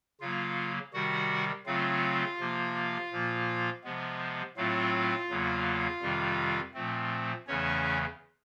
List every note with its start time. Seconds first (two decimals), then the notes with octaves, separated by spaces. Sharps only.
0.20 C#3 F#3 A#3 F4 F5
0.93 C3 D#3 G3 F#4 F#5
1.66 C#3 F#3 A3 C4 F4 F5
2.39 C3 F3 A#3
3.11 A#2 F3 A#3
3.84 C3 F3 G#3 B3
4.57 A2 F#3 A3 C4 F4 F5
5.29 E2 C#3 F#3 A#3
6.02 F2 C3 D#3 G3
6.74 A#2 F3 A3 C4
7.47 E2 C#3 E3 A3 C#4 C#5